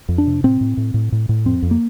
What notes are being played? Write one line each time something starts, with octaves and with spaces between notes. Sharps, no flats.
F2
D4
C3
A2 C4
A2
A2
A2
A2
A2
F2 C4
F2
A#3